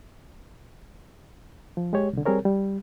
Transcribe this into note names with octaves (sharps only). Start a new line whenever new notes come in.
F3
G#3 G4 C#5
C2 D3
G3 C4 G#4 A#4 C#5
G3